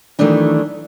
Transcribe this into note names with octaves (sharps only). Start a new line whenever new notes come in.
D#3 E3 F#3 A3 D4 D#4